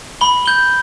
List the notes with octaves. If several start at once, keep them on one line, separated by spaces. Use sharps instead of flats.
B5 G7
G6 G7